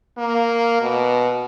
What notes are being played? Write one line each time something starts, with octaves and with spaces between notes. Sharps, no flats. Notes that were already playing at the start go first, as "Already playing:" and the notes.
A#3
B2